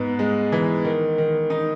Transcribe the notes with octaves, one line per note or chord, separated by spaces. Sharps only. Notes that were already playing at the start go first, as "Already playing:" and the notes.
Already playing: G#2 B3
G#3
E3
D#3
D#3
D#4